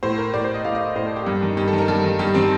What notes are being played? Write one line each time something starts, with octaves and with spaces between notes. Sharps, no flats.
A2 C5
A#4
A2 D5
C5
D#5
A2 F5
D#5
A2 C5
A4
G4
G2
D#3
G2 G4
A4
D#3
A#4
G2 A4
D#3
G2 G4
D#3 C4